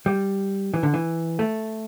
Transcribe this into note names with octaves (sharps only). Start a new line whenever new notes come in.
G3
E3
D3
E3
A3